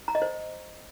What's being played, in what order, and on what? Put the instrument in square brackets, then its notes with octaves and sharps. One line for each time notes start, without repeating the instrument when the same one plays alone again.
[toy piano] A#5
D#5
C5